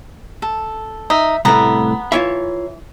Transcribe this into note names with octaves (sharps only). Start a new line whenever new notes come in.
A4
D#4 E5
C2 A2 A3 B3 A#5 B5
E3 F4 C#5 E5